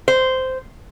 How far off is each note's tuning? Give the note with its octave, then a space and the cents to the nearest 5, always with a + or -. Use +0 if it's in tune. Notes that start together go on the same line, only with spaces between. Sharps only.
C5 -10